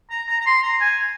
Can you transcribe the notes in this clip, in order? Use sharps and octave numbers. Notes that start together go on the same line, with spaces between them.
A#5
A#5
A#5
C6
A#5
G#5